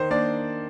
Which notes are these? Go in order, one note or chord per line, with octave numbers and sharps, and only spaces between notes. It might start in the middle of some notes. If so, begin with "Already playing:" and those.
Already playing: D#3 C5
A#3 D4 D5